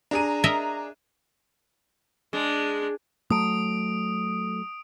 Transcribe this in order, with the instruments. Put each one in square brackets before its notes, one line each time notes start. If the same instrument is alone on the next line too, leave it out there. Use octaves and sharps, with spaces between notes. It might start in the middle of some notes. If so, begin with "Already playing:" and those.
[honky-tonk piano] D4 G#4 D#7 [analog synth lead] A#5
[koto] A#4 D#5 E5
[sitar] G#3 [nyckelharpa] D4
[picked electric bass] F#3 A3 [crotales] D#6 D7